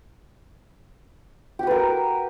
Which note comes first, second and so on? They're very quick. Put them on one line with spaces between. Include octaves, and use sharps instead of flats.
G4 F#4 B4 A#4